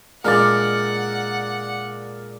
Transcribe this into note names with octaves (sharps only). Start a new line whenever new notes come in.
A#2 G#3 D4 A#4 D5 F#5